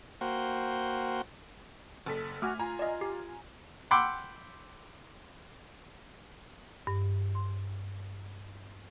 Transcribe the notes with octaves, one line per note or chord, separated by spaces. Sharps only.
A#3 F#4 C5 G5
F#1 A4 B6
A3 F#4 G#5 D6 F6
F4 G#5 A#5
D5 D#5
G4
F#5 G5 B5 C6 D6 E6
G2
C6